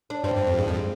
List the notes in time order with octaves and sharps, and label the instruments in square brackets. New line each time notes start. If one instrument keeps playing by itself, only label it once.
[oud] D4
[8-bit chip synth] G2 [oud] C4
[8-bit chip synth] G2
F2
[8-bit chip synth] G2 [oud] G#3
[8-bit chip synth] F2